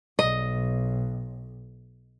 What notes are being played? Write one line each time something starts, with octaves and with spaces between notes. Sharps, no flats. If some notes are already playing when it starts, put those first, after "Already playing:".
B1 D#5